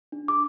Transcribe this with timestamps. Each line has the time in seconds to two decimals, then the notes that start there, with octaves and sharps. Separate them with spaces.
0.12 D4
0.28 D6